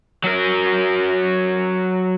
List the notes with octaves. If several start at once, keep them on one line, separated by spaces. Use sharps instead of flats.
F#3 A#4